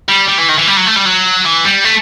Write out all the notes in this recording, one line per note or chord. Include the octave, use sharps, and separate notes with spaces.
G3
G3
E3
D#3
E3
G3
F#3
A3
G3
F#3
E3
G3
A3